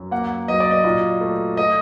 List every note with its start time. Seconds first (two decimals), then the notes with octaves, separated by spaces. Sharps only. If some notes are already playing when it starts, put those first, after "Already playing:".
Already playing: F#2
0.11 A#3 F#5
0.48 F#3 D#5
0.60 D5
0.71 D#5
0.84 A#2
1.21 A3
1.57 A3 D#5